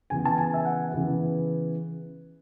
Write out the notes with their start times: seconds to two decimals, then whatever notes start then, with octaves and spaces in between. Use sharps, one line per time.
0.10 C#3 E3 B3 G#5
0.26 A5
0.38 G#5
0.54 E5
0.65 F#5
0.92 C#3 E3 B3